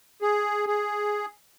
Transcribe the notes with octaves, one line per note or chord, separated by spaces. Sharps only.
G#4
G#4